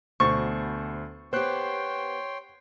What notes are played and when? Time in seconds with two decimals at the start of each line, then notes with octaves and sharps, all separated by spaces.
0.20 D2 B2 C5 C#6 A6
1.33 B3 G4 C5 C#5 G5 C6 F#6